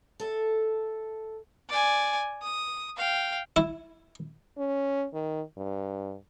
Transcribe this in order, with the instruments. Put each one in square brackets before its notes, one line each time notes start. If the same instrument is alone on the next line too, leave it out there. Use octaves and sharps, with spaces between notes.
[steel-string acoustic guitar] A4 E5
[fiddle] D5 G#5
D#6
F5 G5
[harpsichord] E4
[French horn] C#4
D#3
G2